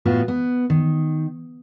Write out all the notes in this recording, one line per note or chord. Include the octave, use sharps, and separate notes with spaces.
A2 B3 F4 F#4
B3
D#3